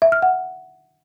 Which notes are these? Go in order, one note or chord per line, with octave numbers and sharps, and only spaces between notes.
E5
F6
F#5